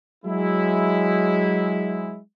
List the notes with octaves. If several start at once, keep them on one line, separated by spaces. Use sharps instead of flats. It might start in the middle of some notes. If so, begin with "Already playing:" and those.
F#3 G#3 E4